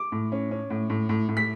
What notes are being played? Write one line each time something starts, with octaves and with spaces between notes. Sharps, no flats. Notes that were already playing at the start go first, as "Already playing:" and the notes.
Already playing: D6
A2
C#4
C#4
A2
A2
A2
A2
B6